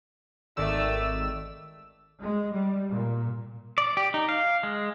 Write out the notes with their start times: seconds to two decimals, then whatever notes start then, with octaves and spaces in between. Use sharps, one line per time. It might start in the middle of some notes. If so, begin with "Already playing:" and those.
0.57 G#1 D#3 A3 D5 E6
2.21 G#3
2.51 G3
2.90 A#2
3.78 D5
3.97 G4
4.14 D#4
4.29 F5
4.63 G#3